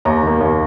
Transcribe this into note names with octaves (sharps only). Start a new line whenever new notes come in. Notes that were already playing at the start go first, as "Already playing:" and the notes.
D#2 A#5
D#3 A#3
D#2